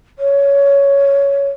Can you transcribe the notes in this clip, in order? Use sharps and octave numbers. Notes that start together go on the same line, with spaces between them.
C#5